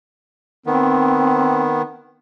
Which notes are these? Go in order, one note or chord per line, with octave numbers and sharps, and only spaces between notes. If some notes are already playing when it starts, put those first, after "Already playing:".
D#3 B3 C4